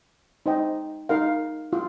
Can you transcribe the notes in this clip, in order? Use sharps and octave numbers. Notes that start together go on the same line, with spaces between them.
D#4 C5 D#5 G5
D#4 A#4 F5
F4